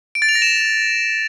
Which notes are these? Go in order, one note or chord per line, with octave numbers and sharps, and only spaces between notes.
D7
A6
F7
A#6
E7